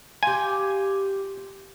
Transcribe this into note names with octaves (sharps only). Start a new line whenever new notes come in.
F4 G4 G#5